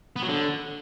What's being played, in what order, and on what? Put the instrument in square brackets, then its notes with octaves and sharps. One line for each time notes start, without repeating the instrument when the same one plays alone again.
[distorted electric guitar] B3
F#3
D3